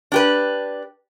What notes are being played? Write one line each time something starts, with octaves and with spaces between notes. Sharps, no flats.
D4 G4 B4